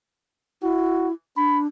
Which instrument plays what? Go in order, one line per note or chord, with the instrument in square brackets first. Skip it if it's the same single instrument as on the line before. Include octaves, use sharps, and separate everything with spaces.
[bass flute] E4 [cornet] F#4
[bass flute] D4 [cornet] B5